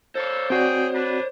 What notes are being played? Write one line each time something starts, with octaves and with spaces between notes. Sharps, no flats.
A#3 A4 C5 C#5
C4 F#4 G#4 D5 G5
D4 B4